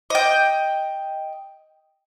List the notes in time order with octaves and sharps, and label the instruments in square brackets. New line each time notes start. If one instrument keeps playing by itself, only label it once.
[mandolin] D#5 G5